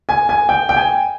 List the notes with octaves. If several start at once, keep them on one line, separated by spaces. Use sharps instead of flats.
G#5
G#5
G5
G5
G#5